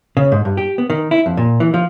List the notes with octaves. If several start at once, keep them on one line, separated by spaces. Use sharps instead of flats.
C#3
G#2
G2
G4
B3
D#3
E4
F2
A#2
E3
F3